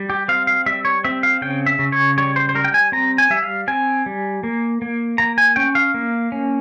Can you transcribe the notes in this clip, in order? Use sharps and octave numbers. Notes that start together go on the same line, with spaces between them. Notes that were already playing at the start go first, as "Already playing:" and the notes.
Already playing: G3
G4
C4 F5
F5
G3 E5
C#5
C4 E5
F5
C#3 G5
E5
C#3
C#5
G3 C#5
C5
C5
G3 A#4
G5
G#5
C4 A#5
G#5
G3 E5
F5
C4 G#5
G3
A#3
A#3
A#3 A#5
G#5
C#4 G5
F5
A#3
C#4